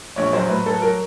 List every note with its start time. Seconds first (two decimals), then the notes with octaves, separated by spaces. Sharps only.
0.16 A#1 C#5
0.33 F#3 C5
0.49 A2 B4
0.66 F#3 A4
0.82 F#3 A#4